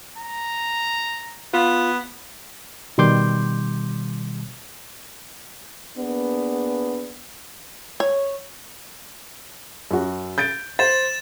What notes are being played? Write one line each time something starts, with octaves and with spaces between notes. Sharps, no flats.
A#5
B3 F4
B2 D#3 G3 C6 D6 G6
A#3 B3 D4 G#4 B4
C#5
F#2 F#4
G6 A6 D7
C5 A6 E7